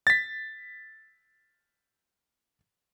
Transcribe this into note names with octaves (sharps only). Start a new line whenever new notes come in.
A6 B6